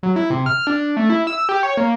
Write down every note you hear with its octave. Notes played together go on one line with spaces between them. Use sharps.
F#3
E4
C3
F6
D4
A3
E4
E6
G4
C#5
A#3